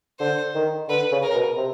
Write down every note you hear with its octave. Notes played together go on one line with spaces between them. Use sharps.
D3 C5
D#3
D3 B4
C#3
A#4
B2
C3